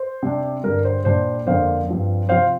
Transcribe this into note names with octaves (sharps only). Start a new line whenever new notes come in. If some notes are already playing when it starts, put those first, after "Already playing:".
Already playing: C5
C3 G3 D4
G2 D3 G3 A#4
C5
A#2 G3 D4 C5
F2 D3 A#3 D4 C5 F5
G2 F3 C4
C3 F3 C4 C5 F5